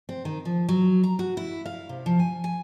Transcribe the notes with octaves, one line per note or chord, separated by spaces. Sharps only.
C4
D#3
F3
F#3
A#5
F#4
E4
F5
C3
F3
G#5
G#5